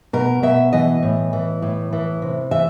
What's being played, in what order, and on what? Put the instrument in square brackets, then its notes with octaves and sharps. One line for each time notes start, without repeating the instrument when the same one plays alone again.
[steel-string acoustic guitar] B2 A#4
B2 E5
E3 D#5
A2
E3
A2
E3
C3
E3 E5